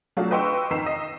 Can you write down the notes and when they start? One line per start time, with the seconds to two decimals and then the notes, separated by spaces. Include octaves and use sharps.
0.17 F#3 A3 D4 F4 F#4 G#4
0.31 B4 D#5 G5 C6 C#6 E6
0.70 F2 D#3 A#5 B6 C7 E7
0.86 D#5